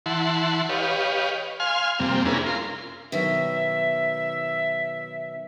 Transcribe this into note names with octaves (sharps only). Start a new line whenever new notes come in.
E3 E4 F#5 A5 C6
G4 B4 C#5 D#5 F5
F5 G#5 C6 F6
F2 C3 G3 A#3 C4
C#4 D4 E4 G#4 A#4 B4
F4 A#4 C6
B2 D#3 F#3 E5